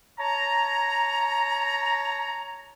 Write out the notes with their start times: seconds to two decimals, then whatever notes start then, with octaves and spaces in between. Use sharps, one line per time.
0.18 C#5 A5 A#5